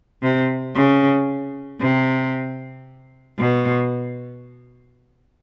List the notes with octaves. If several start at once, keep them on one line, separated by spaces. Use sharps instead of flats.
C3
C#3
C3
B2